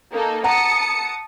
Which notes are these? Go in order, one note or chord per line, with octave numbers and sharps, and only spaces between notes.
A#3 D#4 A4
F#5 A5 A#5 D#6 C#7